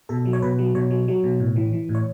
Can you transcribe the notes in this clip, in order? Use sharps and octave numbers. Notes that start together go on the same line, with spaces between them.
B2 A4
F#3
C#5
B2 B4
F#3
B2 C#5
F#3
F#3
B2
A2
E3
E3
A2
C#5